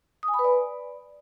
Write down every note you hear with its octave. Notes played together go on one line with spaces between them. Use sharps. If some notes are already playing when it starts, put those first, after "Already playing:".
D#6
G#5
B5
B4
D5